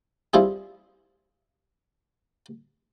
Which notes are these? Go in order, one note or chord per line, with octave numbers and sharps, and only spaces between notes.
G3 C4 E4 F4 G#4